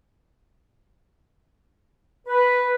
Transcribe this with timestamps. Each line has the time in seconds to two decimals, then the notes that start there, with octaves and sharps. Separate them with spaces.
2.27 B4